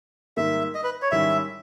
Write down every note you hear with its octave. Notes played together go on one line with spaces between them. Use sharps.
G#2 D#3 G3 A#3 E5
D#5
B4
C#5
G#2 D#3 G3 C#4 E4 E5